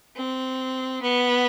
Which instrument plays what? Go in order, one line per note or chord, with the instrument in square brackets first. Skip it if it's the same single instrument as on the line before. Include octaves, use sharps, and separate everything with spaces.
[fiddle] C4
B3